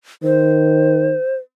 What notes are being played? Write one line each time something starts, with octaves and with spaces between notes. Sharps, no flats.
D#3 C5